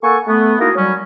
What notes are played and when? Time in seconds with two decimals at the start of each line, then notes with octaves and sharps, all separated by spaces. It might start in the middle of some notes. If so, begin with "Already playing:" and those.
0.02 A#3 A4 F#5 G#5 C#6
0.27 A3 B3
0.60 A#3 D#4 E4 F#4 G#4 A#4
0.75 F#3 G3 C#4